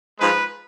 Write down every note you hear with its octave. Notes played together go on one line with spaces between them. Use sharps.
G#2 F3 G#3 B4